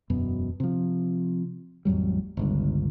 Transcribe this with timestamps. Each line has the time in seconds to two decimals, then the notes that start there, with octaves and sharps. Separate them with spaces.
0.10 E1 F#2 B2
0.60 C3 F3
1.85 A1 F2 F#3 G3
2.37 G1 C#2 G2